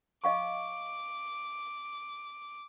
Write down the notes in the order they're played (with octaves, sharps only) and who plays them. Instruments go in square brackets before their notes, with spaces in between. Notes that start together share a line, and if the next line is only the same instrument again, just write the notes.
[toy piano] D#5 F5 C#6 [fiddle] D6